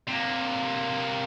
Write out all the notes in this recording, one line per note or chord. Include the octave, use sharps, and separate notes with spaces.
C3 A#3